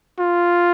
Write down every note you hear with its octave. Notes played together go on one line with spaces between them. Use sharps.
F4